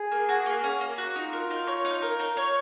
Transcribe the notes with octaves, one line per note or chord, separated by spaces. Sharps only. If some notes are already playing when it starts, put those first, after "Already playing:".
Already playing: G#4
A#3
F#4
A#3
C#4
A#3
F#4
D#4 F4
A#4
D#4
C#5
D#4
A#4
D#4
C#5